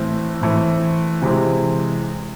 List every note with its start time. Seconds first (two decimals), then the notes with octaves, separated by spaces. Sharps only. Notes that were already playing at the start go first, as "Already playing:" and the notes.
Already playing: A2 E3 A3 C4
0.41 A2 E3 A3 C4
1.22 C3 E3 G#3 C4